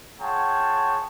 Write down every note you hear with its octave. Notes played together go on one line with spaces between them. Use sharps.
F4 G#4 C#5 F#5 G5 A5